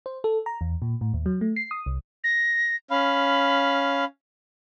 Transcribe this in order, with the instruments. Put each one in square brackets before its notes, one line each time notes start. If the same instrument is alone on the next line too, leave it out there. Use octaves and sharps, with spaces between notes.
[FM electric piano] C5
A4
A#5
E2
A#2
A2
D#2
F#3
A3
C7
D#6
C2
[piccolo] A#6
[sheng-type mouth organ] C#4 F5 [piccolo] B5